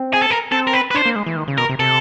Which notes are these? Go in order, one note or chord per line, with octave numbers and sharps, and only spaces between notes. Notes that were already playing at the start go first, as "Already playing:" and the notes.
Already playing: C4
G#4
A4
A#4
C4 A4
A#4
B4
B4
D4 C5
A#3
G#3
E3
D#3
C#3
B2 A#4
C3
C3 A4